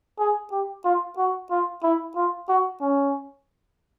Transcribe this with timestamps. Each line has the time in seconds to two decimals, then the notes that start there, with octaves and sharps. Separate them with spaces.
0.19 G#4
0.52 G4
0.85 F4
1.18 F#4
1.50 F4
1.83 E4
2.16 F4
2.49 F#4
2.82 C#4